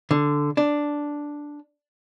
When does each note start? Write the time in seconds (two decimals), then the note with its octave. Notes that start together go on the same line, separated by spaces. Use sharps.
0.11 D3
0.57 D4